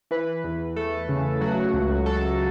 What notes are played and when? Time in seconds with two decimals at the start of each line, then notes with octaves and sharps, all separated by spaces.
0.11 E3 B4
0.44 E2
0.76 A3 A4
1.09 C#3
1.41 F#3 F#4
1.74 C#2
2.06 C#2 A4